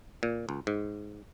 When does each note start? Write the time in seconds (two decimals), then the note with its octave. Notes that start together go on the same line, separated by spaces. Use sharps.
0.23 A#2
0.49 C#2
0.67 G#2